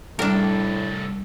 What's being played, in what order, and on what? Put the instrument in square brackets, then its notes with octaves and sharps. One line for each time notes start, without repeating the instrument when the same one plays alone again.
[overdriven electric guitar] C2 A4 [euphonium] A2 [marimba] G3 [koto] D4 A#4